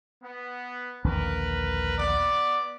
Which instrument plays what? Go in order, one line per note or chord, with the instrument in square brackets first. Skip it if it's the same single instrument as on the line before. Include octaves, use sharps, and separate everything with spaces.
[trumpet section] B3
[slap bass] A#1 D#2 D3 [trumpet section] A#4 B4
[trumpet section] B3 D5